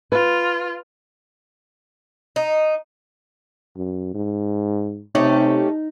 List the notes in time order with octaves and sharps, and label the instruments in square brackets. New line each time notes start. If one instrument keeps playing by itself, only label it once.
[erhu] F4 [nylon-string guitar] B4
[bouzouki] D#4
[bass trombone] F#2
G#2
[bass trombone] C3 [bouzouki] A3 C#4 G4 [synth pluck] D#4